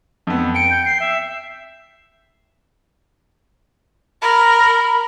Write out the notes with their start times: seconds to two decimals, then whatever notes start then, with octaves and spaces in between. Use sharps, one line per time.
0.27 F2 B3
0.55 G5 C#7 D7
0.71 G6
0.85 C7
1.00 E5
4.22 A#4 B5